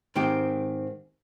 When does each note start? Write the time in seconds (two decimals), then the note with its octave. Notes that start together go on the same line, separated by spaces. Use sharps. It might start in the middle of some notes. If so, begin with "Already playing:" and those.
0.15 G#2 D#3 C4 G4